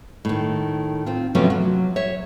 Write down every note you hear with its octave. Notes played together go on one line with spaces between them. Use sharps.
A2 D#3
C4 F4
C3 F3 F#3 A3 B3 C#4
F#3
C#5 E5